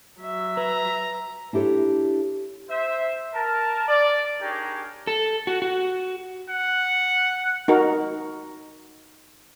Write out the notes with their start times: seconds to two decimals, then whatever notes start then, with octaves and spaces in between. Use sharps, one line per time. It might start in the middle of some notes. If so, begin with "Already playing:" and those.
0.20 F#3 E5
0.57 B4 A#5
1.53 D4 E4 G4 A4 C#5
2.70 C5 E5
3.34 A#4 A5
3.89 D5
4.42 D4 D#4 G4 G#4 A#4 C#5
5.07 A4
5.47 F#4
5.62 F#4
6.50 F#5
7.68 D#4 F#4 A#4